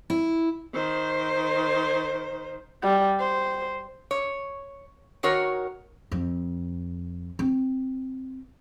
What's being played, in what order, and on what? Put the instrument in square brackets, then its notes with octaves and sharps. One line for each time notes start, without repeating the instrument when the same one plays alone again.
[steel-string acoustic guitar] E4
[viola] D#3 C5
[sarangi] G3
C5
[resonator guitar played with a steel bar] C#5
D#3 F#4 A#4 C#5
[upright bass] F2
C4